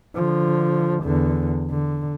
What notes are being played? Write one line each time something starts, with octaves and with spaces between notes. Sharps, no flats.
D3 F3
E2 D3
D3